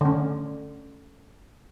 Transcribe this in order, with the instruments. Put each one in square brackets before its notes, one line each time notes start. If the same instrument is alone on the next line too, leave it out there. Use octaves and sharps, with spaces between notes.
[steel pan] D3 C#4